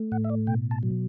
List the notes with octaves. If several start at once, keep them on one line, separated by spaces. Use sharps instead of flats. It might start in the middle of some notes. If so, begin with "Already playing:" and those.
Already playing: A3
A2 F#5
E5
D5
B2 G5
A5
F#3